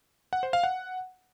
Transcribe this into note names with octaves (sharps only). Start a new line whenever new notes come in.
F#5
C5
F5
F#5